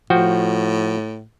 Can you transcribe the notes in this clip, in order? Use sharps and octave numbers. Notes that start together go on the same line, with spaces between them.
A2 F3 F#4 G5